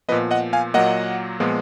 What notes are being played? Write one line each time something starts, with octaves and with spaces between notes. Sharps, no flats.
A#2 F3 B3 B4 D#5
D#5 F#5
F5 G#5
A#2 F#3 A#3 D#5 F#5
A#2 F3 G#3 B3